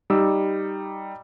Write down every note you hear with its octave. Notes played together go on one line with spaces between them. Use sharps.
G3 D#4 D6 E6